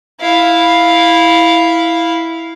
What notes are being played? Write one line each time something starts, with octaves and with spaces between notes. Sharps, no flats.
E4 F5